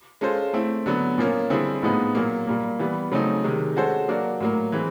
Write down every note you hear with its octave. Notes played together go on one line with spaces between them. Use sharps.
G#3 C#4 F4 A4 C5
A3 C4 E4
D3 F#3 B3
A#2 F3 A#3 C#4
D3 G3 C4 E4 G#4
A2 F3 G#3 B3 D#4
A#2 F#3 A#3
A#2 G3 A#3
E3 G3 B3
C#3 F#3 A3 C4 D#4
C3 D#3 G#3
G#3 C#4 F#4 A4 C5
F#3 A#3 D4 F#4
A2 F#3 A#3
E3 G#3 C4